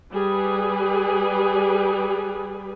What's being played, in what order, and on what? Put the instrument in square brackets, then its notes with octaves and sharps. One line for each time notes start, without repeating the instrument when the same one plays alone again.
[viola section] G3 G#4 B4